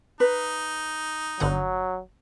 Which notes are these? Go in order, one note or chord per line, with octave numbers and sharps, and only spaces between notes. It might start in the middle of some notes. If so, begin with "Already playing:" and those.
D#4 B4
G1 D3 F#3 F#5